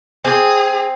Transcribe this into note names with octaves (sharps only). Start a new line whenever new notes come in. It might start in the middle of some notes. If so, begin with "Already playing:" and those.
C4 G#4